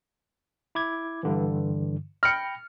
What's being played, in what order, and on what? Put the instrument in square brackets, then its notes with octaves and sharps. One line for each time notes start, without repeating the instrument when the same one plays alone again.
[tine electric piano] E4 D6 G#6
G2 D3 E3
[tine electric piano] G5 B5 A#6 [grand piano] F6 C#7